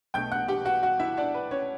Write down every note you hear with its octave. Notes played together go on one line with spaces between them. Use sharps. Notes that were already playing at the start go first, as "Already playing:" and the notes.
B1 B2 A3 G5 G6
F#5 F#6
G4 G5
F#4 F#5
F#4 F#5
E4 E5
D4 D5
B4
C#4 C#5